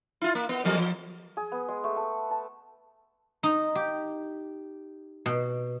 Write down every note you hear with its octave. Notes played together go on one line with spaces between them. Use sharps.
E4 F4
A#3
B3
F2 F#3 A#3
F3
G#4
B3
G#3
A3
A4
A5
D#4
G4
B2